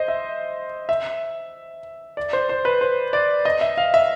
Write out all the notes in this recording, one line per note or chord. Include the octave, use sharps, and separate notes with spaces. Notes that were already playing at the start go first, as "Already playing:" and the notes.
Already playing: C5 D#5
E5
E5
D5
C5
C5
B4
C5
D5
D#5
E5
F5
E5